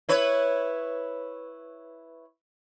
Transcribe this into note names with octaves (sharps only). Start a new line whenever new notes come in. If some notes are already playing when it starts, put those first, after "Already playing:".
E4 B4 C#5